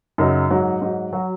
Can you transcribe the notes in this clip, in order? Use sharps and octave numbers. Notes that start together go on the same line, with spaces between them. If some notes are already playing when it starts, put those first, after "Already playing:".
F#2 C#3 F#3 D#4
G#2 F#3
G#2 F#3
F#3 F#4